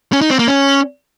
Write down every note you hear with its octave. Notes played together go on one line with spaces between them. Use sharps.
C#4
D#4
C4
A#3
C#4